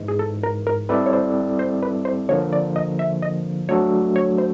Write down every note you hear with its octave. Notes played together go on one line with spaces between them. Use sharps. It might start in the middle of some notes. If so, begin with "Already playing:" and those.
Already playing: G#2 E3 G#3
G#4
A4
A#4
A#4
G3 C4 E4 A4 B4 D5
C#5
C5
C5
B4
C5
D3 F3 A#3 C#5
D5
D#5
E5
D#5
F#3 A3 D4 F#4 A4 C#5
C#5
C5